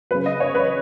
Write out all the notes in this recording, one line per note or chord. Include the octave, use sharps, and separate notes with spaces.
C#3 F#3 B4
D#5
C#5
B4